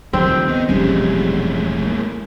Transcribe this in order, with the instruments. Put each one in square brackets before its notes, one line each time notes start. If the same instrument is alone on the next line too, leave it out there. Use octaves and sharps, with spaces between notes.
[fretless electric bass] D2 D3 G3 [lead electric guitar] D#3 F3 [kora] C4
[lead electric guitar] D#3 D#4 [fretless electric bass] B3
[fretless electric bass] E1 A#1 [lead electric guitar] A2 G#3 [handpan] G3 C#4
[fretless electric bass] A#3